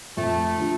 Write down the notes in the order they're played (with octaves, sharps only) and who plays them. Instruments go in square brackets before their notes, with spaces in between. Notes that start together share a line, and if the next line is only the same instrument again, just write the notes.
[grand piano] F2 [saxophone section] A3
[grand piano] D3 F3